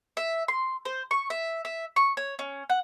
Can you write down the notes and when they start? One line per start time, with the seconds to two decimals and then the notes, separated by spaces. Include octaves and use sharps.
0.17 E5
0.48 C6
0.85 C5
1.11 C#6
1.30 E5
1.65 E5
1.96 C#6
2.17 C#5
2.39 C#4
2.70 F#5